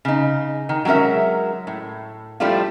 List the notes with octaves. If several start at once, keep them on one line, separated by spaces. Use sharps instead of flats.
C#3 D#4
D#3
F#3 G#3 C#4 A#4 E5
A2
F3 G3 A3 D4 E4 F4